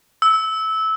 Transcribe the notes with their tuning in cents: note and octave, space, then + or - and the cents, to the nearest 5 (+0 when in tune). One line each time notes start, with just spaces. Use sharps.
E6 -15